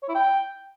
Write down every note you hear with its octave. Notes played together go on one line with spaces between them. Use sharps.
C#5
E4
G5